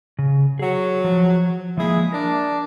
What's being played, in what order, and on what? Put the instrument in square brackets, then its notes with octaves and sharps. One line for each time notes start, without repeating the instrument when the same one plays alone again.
[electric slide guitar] C#3
[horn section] F#3 [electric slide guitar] G#4 F#5
[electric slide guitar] F3
[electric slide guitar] F3 G#3 A#3 [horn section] E4 G#4
[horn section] D4 [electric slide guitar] A#4